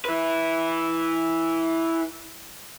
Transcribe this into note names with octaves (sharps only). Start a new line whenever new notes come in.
E4 B4